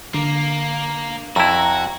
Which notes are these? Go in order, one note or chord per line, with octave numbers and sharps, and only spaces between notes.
D3 A#3
F2 E4 F#4 A#5